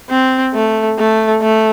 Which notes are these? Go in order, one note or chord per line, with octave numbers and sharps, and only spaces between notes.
C4
A3
A3
A3